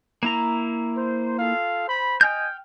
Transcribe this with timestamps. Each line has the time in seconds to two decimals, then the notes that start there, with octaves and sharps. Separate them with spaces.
0.23 A#3 E4 A#5
0.96 C5
1.38 F4 A4 F5
1.88 C5 B5
2.21 D#5 G5 G#5 F6 G6